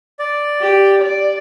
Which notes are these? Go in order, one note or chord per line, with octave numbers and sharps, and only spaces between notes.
D5
G4
D5